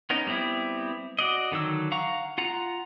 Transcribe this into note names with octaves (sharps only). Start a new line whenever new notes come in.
B3 C#4 D#4 A#4
G3 B3 C4 E4
F#4 D5 D#5
D3 D#3 F#3 E6
F5 F#5 A#5 C#6
F4 F#5 A#5